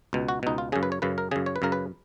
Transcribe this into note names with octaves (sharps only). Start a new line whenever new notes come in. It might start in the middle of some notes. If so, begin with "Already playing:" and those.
C#2 B2
F#4
C#2 B2 D#4
F4
F#2 C#3 G#4
B4
C#5
F#2 C#3 B4
A#4
F#2 C#3 G#4
C#5
B4
F#2 C#3 A#4
B4